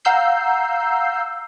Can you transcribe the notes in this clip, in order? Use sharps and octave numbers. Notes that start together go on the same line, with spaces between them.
F5 F#5 A#5 E6 G6 C7